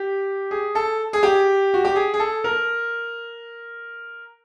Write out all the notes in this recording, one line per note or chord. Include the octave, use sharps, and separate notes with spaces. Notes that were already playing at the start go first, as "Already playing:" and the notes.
Already playing: G4
G#4
A4
G#4
G4
F#4
G4
G#4
G#4
A4
A#4